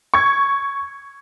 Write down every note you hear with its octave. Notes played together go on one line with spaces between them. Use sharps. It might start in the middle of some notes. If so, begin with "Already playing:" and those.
C#6 G#6